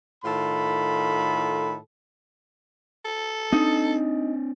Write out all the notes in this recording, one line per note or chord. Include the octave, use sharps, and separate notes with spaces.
A2 D#3 F4 A4 B5
A4
C4 D4 D#4